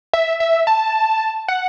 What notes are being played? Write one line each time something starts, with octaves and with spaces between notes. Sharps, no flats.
E5
E5
A5
F#5